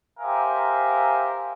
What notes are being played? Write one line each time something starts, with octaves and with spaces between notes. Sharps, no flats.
G4 A#4 C5 E5 F5 G#5